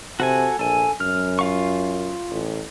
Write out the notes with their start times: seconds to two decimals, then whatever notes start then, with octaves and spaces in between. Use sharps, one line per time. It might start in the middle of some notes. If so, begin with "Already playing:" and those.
0.20 C3 F#4 A4 G#5
0.59 A#1 A4 G#5
1.00 F#2 F6
1.39 F4 F5 C#6
2.31 A1